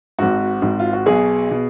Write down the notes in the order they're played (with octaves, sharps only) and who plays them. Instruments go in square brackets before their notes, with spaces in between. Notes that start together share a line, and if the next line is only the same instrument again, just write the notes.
[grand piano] G#1 G#2 F#4
G#1 G#2
F4
F#4
B1 B2 G#4
B2